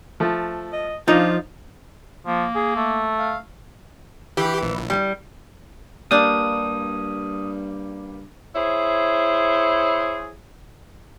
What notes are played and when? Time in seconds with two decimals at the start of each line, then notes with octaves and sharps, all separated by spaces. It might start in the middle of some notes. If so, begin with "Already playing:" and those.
0.20 F3 A3
0.73 D#5
1.08 F3 D4 D#4 F4
2.27 F3 A#3
2.55 G#4
2.76 A3
3.19 F5
4.37 E3 G4
4.62 A#1
4.90 G3
6.11 G2 G3 A#3 D4 F5 D#6 G6
8.56 E4 G#4 C5 C#5